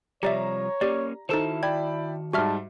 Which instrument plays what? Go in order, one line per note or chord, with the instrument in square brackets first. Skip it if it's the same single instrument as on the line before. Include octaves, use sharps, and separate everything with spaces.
[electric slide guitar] C3 F3 G3 [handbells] G4 D5 E5 [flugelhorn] C#5 [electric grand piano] A#5
[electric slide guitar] A#3 C#4 [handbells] G4 D5
[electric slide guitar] D#3 F#4 A5 [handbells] D#4 A4 C5 [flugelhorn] E4
[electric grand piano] D5 G5 B5 [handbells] G#6
[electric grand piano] G#2 G3 [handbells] F#4 E5 F6 [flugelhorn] A5